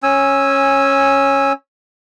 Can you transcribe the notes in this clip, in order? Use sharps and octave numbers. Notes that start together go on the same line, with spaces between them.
C#4 G#5 E6